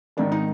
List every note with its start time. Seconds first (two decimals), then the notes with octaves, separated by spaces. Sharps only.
0.17 G#1 G#2 D#3 D4
0.32 D#4